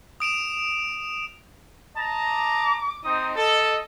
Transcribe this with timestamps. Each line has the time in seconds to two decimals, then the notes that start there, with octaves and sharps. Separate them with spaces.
0.20 D#6 D7 E7 F7
1.97 D#5 A5 A#5
2.31 D6
3.04 C4 D#4 D#6
3.36 A4 D#5